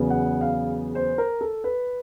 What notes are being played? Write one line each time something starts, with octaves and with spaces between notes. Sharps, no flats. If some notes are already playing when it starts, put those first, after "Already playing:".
Already playing: E2 C#3 F#3 B3
F#5
F5
C5
A#4
A4
B4